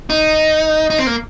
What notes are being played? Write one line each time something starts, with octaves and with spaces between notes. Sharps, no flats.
D#4
D#4
C4
A#3